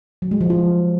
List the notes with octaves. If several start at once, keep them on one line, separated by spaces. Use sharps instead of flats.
F#3
G#3
F3
F4